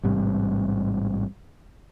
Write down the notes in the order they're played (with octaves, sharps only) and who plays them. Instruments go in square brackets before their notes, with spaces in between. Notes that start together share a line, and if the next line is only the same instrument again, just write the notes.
[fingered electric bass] A1 G#2 C3 G3